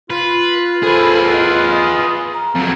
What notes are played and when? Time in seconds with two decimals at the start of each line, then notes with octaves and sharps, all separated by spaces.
0.10 F4 B4
0.83 G#4 A4 B4 C5 B5
1.31 D#5 F#6
1.72 D#6
2.34 A#5
2.55 F2 F#3